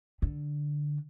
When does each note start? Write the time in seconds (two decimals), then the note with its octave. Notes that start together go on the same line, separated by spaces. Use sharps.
0.22 D3